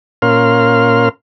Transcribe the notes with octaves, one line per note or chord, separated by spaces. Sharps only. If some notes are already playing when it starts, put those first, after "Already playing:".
A#2 C#4 A#4 F5 C6 F6